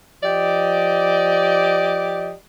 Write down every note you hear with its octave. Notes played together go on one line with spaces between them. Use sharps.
F3 G4 D5 D#5